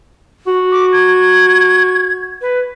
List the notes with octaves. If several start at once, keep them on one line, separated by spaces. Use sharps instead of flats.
F#4
D6
G#6
B4